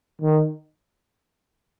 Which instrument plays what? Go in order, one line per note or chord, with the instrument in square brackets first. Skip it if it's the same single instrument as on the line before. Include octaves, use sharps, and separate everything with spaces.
[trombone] D#3